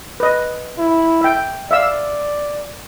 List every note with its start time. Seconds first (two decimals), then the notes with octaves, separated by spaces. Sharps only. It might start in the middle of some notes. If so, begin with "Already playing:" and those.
0.20 B4 D#5
0.78 E4
1.21 E5 G5
1.71 D5 E5 F5 E6